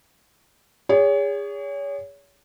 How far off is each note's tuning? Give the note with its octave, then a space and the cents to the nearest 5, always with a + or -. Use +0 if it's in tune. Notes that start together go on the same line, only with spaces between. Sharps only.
G#4 -30 C#5 +30